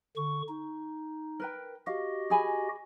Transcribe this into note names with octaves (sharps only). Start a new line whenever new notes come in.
D3 C#6
D#4
A#4 B4 G5
F#4 G4 D#5 F5
G#4 G#5 B5